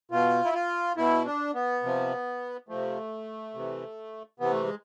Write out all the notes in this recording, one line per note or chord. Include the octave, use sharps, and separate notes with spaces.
B2 F4
E4
F4
B2 E4
D4
B3
C3 F3
C3 F3 A3
C3 E3
C3 E3 B3
A3
G#3